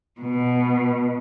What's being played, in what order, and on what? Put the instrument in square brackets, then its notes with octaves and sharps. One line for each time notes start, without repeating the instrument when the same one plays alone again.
[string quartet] B2